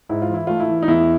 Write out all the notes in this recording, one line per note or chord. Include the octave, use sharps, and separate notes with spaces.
G#2 E4
F4
E3 E4
A3 F4
E4
E3
D#4
E2 E4